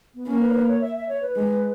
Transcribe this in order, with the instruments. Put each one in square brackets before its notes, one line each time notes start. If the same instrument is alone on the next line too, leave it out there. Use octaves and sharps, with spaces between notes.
[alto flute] B3
[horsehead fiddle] A#3 [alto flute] C#4
[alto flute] B4
C#5
B4
C#5
E5
E5
C#5
B4
[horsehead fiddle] G#3